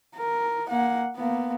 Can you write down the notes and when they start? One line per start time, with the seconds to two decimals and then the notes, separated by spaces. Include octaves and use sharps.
0.16 A#4
0.69 A#3 F#5
1.17 A#3 B3